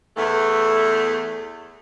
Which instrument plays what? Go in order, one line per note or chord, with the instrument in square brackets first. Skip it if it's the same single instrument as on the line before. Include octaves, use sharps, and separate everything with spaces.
[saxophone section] E2 A3